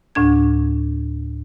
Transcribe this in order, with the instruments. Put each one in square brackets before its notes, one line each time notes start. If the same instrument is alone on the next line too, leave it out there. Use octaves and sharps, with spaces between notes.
[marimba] D2 A2 D4 G#6